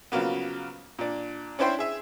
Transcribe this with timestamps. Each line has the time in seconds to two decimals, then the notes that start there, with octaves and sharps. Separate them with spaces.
0.12 C#3 F3 F#3 A#3 B3
0.99 A#2 D4
1.59 C#4 D4 E4 C5 G5 C6
1.79 G#4 E5 G#5